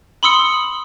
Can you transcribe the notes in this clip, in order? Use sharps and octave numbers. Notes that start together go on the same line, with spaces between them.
B5 C6 D#6 E6 C#7